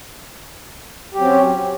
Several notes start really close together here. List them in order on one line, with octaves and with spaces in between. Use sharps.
G4 F#3 C4 C#4